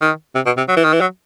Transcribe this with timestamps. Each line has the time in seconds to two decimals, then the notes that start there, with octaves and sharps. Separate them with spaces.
0.02 D#3
0.35 C3
0.46 B2
0.58 C3
0.69 F#3
0.77 E3
0.84 D#3
0.93 E3
1.01 F#3